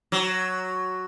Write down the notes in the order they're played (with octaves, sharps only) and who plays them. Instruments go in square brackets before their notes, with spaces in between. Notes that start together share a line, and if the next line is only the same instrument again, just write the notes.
[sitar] F#3